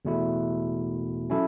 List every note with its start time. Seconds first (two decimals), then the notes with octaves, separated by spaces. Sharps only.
0.05 E2 B2 A3 E4
1.30 F#3 C#4 E4 A4